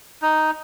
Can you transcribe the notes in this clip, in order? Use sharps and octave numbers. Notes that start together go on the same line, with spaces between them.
D#4